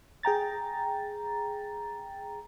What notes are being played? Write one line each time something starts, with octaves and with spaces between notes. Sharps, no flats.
G#4 G5 A#5 A6